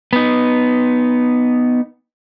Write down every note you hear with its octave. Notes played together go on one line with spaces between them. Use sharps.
B3 D#4